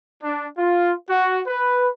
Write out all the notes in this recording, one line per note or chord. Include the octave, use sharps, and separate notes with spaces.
D4
F4
F#4
B4